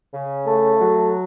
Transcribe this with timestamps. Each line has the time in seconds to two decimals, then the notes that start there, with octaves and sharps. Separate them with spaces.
0.13 C#3
0.45 A3
0.79 F#3